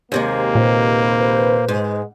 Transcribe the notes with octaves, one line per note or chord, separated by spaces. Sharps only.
D#2 C3 G#3 A#3 C5
A#2 B4 C5
G#2 G#3